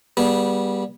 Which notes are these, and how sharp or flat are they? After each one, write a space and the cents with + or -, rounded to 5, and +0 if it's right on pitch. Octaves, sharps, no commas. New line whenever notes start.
G3 +0 B3 -30 G#4 +0